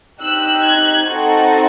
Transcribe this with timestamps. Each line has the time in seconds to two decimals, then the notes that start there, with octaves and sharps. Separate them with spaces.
0.21 C4 D#4 G4 E6 F#6
0.64 F#6 G#6
1.07 C4 D#4 F#4 A4